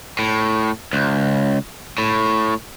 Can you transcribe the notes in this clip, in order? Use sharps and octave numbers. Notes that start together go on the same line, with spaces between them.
A2
C#2
A2